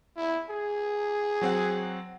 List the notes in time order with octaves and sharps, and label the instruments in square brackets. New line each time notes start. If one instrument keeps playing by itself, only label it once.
[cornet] E4
G#4
[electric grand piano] F#3 C4 F#5